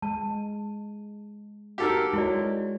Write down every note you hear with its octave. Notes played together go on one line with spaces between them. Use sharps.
G#3 A5
D#4 F#4 G4 A4 A#4 F#5
G#3 E4 F#4 C#5 D5